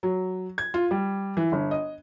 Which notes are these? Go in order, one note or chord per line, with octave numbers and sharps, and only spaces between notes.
F#3
G#6
F4
G3
E3
G1
D#5